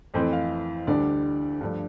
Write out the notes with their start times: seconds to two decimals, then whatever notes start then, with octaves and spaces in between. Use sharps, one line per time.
0.14 F2 E3 A3 C4 C5
0.33 F5
0.87 D2 D3 G3 D4 D5
1.61 G2 F3 A3 D4